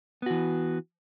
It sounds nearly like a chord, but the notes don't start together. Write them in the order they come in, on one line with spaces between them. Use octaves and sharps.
B3 F#4 E3